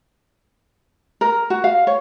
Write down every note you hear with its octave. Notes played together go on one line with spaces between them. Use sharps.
A#4
F#4
F5
C#5